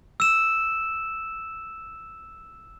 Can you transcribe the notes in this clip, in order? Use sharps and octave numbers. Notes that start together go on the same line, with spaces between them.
E6 E7